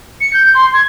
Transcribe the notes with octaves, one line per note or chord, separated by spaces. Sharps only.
C#7
G6
C6
G#6